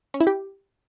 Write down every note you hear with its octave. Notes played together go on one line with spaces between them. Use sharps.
C#4
E4
G4